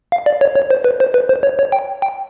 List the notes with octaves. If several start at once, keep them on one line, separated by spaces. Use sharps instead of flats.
F5
D5
C#5
C#5
C5
B4
C5
B4
C5
C#5
C#5
G5
G5